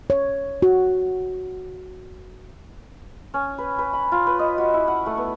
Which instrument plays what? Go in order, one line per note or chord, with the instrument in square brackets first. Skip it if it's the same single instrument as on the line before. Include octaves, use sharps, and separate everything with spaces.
[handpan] C#5
F#4
[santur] C#4
B4
B4
B5
F4
B4
D#5
F#4
E4
F#5
A3
B3